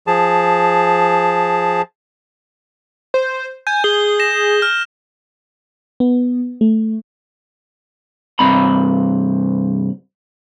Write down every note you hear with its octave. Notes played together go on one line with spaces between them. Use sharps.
F3 G#4 A5
C5
G#5 G6
G#4 G7
A#6 E7
F6
B3
A3
C2 G2 C4 A#5 B5